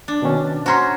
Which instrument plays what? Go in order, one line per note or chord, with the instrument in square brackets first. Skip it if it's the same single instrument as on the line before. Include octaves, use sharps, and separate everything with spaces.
[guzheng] D4
[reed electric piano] B2 D#3 C#4
[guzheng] C#4 F#4 [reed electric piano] C5 A#5 C6